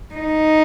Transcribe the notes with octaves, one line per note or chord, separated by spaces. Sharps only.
D#4